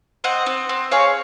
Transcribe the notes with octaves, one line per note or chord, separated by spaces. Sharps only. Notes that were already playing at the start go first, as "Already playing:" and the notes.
C4 D#5 F#5
C4
C4
G#4 C#5 F5